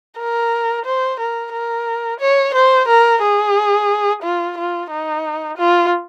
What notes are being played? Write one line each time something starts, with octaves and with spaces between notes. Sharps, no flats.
A#4
C5
A#4
A#4
C#5
C5
A#4
G#4
F4
F4
D#4
F4